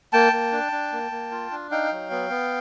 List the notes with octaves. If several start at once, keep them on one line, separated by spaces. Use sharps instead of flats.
A#3 G5 A5
A#3
D4
D4
A#3
A#3
F4
D4
D#4 F5 G5
F#3
B3
B3